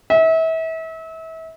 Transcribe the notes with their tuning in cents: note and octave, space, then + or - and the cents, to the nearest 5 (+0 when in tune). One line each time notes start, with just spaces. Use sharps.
E5 -30